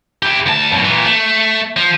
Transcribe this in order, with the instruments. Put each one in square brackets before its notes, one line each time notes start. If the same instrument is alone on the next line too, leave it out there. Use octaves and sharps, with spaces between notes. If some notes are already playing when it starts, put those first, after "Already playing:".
[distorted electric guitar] E4 G4
D2 A5
F#2 B2
A#2 E3
A3
F3